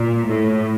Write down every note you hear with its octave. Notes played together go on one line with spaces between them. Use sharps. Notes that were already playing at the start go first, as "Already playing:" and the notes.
Already playing: A#2
A2